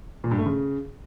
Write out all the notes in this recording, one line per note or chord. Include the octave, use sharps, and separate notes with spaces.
A#2
G2
A3
C#3